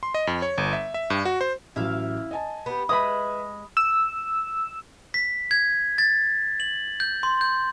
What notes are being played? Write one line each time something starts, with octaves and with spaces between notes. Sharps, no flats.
C6
D#5
F2
C#5
G1
E5
E5
G2
F#4
C5
A1 F#3 E4 E5 F5
D#5 G#5 A5
B3 G4
G#3 B4 E5 B5 D#6
E6
B6
G#6
A6
F#7
G6
C6
G6